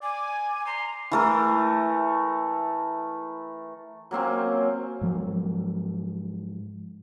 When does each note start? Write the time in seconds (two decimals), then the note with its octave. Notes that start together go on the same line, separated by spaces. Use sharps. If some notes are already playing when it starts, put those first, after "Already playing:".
0.03 D5 G#5
0.66 A#5 C6
1.11 E3 A3 A#4
4.11 F#3 A#3 C4 C#4
5.01 G#2 F3 F#3